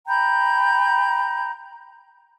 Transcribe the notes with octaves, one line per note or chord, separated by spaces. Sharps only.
G5 A#5 B5 G6